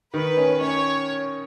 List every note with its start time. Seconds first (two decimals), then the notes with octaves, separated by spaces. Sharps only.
0.13 D#3 B4
0.37 C#4
0.61 C#4 C#5